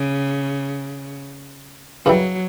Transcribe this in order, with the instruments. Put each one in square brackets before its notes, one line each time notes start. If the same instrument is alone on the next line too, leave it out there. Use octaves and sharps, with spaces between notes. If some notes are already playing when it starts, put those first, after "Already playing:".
Already playing: [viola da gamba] C#3
[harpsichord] F#2 C#3 E3 G3 [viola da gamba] F#3